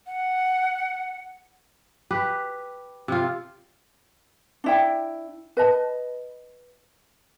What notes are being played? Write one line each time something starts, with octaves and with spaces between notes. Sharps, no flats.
F#5
G4 B4
C3 F4
D4 E4 G5
B4 D#5 A5